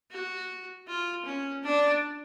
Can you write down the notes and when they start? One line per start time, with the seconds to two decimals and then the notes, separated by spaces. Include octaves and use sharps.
0.11 F#4
0.88 F4
1.25 C#4
1.63 D4